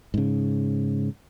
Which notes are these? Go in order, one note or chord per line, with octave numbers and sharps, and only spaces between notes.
G#2 C#3